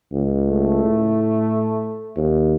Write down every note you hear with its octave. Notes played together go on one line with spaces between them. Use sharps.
C#2
A3
A2
D#2